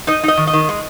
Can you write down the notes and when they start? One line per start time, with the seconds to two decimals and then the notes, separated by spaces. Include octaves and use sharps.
0.07 D#4 D#5
0.23 D#4 D#5
0.37 D#3
0.47 D#5
0.53 D#3
0.69 G#3